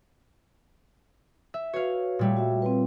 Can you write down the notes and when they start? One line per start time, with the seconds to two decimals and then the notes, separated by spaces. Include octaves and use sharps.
1.54 E5
1.74 F#4 B4 C#5 F5
2.19 A#2 G3 A3
2.37 F#4 E5
2.62 C4 F4 B4